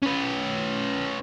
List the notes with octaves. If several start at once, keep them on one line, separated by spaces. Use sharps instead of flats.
C#4 B4